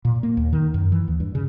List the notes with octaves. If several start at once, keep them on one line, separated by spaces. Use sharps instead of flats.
A#2
A#3
D#2
D#3
F#2
E3
D#2
G2
C#3